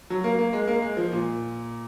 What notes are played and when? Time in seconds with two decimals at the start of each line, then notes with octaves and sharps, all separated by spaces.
0.10 F#3
0.24 A#3
0.39 A#3
0.53 G#3
0.67 A#3
0.82 G#3
0.97 F3
1.11 A#2